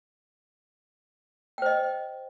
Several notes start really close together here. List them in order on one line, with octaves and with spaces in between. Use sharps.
G5 C5 D#5